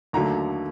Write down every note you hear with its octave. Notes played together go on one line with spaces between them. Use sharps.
D#2 D3 F#3 A3 A#5